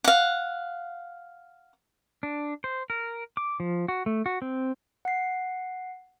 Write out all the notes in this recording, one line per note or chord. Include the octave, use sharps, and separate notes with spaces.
F5 F#5
D4
C5
A#4
D6
F3
F#4
A3
F#4
C4
F#5 C7